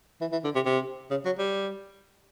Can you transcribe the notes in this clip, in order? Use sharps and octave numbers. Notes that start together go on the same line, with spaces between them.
E3
E3
D3
C3
C3
C#3
F#3
G3